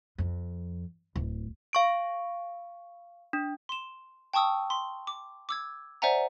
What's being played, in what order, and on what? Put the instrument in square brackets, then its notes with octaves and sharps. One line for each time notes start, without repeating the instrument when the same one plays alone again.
[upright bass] F2
D1
[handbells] F5 C#6 D7
D4
[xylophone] C6 E7
G5 A5 C#6 D#6 E6
C6
D6
D6 E6 G#6
C5 D5 E5 F#5 G#5 A#5